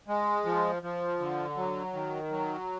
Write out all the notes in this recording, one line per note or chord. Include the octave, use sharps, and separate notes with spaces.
G#3
F3
F3
D3
F#3
D#3
F#3